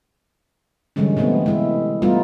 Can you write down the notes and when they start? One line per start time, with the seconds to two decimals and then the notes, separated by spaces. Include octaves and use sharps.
0.96 D3 E3 G3 G#3 C#4
1.17 C3 A3 B3 C4
1.46 G#3 E4
2.02 G3 A3 B3 D#4 F4